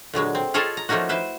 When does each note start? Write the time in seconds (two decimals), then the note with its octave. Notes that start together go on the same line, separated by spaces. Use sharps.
0.14 A#2 D3 F#3 G#3
0.35 C4
0.54 F4 G#4 A4 C#5 D#5 F5
0.77 A#5
0.89 F3 A3 A#3 C#4 D#4 F#4
1.09 E4 B4 C5